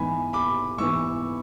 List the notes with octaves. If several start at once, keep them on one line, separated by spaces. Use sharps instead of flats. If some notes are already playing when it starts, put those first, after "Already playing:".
Already playing: G#2 E3 B3 G#5 B5
B5 D6
G#2 E3 B3 C#6 E6